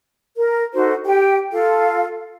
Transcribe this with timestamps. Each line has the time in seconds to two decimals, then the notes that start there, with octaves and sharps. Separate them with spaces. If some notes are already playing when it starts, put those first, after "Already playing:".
0.36 A#4
0.74 D#4 F#4 A4 C5
1.05 G4 G5
1.52 F4 A4 F5